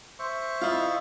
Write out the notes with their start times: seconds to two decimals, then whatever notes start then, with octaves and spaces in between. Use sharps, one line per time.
0.19 C5 E5 C#6
0.62 E4 F4 D#5 F5